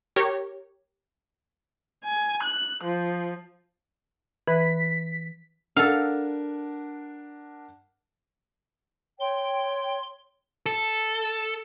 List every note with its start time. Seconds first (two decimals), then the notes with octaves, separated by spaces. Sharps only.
0.16 G4 A#4 C#5
2.04 G#5
2.43 F#6
2.84 F3
4.48 E3 B4 B6
5.76 D4 A4 A#4 F5 F#5
9.20 C#5 G5 C6
10.66 A4